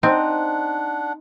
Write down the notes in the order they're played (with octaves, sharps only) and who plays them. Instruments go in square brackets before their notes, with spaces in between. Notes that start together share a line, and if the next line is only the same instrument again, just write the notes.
[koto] C4 [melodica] D4 F#5 [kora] D#4 D#5